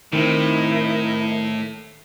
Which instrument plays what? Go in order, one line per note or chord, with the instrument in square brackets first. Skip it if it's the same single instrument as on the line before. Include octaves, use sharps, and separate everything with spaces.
[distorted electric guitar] A2 [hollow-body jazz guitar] D#3 C4 [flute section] D#4 E4 A#4